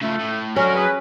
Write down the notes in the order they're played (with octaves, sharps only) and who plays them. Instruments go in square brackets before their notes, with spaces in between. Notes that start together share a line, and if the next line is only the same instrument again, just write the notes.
[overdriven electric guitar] C#3 F3 [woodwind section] A3
[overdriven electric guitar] A2
[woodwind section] D3 G#3 A#4 [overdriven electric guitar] F#3 [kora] C#4
[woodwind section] G#4 B4